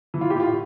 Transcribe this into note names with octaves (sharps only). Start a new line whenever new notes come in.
E3
F4
G4
A2 F4